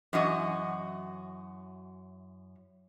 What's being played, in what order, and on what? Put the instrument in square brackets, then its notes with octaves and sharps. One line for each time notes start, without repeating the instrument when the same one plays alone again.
[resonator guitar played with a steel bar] F#2 E3 F#4 D#5